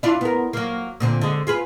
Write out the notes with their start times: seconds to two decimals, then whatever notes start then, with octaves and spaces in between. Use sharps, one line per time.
0.03 D4 E4 F4
0.21 B3 A#4
0.53 F#3 A#3
1.00 A#2 D3 C4
1.21 D3 G#3
1.47 F4 G#4 B4